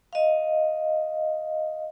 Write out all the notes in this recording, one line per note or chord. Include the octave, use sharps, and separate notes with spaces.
D#5 F5